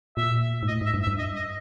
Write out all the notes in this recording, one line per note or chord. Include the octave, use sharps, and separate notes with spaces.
A#2 E5
G#2
A2 D#5
G#2
E5
G2
E5
G2
D#5
D#5